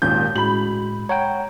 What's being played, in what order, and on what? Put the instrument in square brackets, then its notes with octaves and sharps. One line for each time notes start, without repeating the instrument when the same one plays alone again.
[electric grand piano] G#1 D#2 A#2 [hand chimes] C#4 [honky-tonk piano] G6
[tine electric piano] A2 [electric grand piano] G#3 [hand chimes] F#4 [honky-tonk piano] B5 F#7
[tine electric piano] C#5 F#5 G5 [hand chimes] A#5